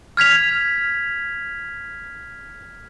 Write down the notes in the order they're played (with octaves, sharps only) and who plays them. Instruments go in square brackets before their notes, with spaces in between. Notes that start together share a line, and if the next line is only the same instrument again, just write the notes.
[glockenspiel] F6 G#6 B6 F7